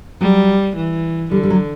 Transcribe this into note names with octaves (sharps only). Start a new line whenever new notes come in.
F#3 G3
E3
D3 G3
G3
F#3